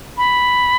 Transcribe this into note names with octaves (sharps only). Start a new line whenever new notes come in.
B5